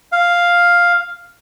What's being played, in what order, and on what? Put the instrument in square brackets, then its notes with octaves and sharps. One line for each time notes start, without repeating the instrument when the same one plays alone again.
[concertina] F5